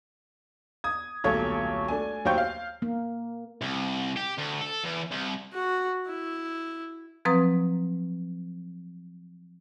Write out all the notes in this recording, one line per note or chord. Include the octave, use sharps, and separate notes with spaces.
D#6 G#6
D#1 B1 A3 C#5 G#6
A3 D4 G#5
D#2 F#3 C5 C#5 G5 G6
F5
A#3
C2
G4
D2
A4
E2
C2
F#4
E4
F3 F#3 C4 B4 A#5 D#6